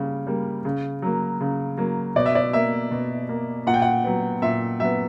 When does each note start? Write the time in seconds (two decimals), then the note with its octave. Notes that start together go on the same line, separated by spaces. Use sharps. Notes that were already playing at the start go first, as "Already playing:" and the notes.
Already playing: C#3 G3 A#3
0.27 G3 A#3
0.65 C#3
1.02 F#3 A#3
1.41 C#3
1.78 F#3 A#3
2.16 B2 D5
2.26 E5
2.35 D5
2.53 A#3 E5
2.91 B2
3.29 A#3
3.67 A#2 F#5
3.74 G5
3.82 F#5
4.04 F#3 B3
4.42 A#2 E5
4.80 F#3 B3 E5